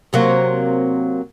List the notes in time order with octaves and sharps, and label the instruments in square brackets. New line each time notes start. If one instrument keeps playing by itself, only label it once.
[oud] C3 F#3 A#3